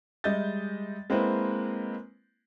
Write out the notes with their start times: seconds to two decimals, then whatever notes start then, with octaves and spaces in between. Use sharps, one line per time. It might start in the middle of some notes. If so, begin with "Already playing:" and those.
0.24 G3 G#3 D#5 E5 G6 A6
1.10 G#3 A#3 C4 E4 B4 C5